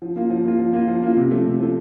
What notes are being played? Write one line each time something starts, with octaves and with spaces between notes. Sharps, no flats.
F3
A#3 F4
F3
A#3 F4
F3
A#3 F4
F3
A#3 F4
C3
F3 A3
C3
F3 A3